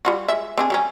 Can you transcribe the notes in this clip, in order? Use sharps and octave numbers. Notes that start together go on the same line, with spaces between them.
G3 F4 F#4
G#3 E5
C4 D4 G#4
F#3 G3 C#4